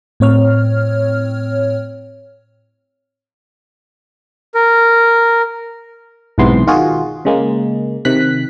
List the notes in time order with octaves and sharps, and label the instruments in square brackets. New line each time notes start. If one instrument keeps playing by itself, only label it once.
[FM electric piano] A2 C4 C#5 F6
[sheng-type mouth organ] A#4
[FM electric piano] B1 G#2 C3 E3 B3 C6
D#3 F4 F#4 G#4
C#3 G#3 A#3
C3 D#3 F#6 B6